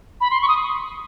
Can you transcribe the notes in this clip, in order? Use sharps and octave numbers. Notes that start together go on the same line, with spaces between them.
B5
C6
C#6
D#6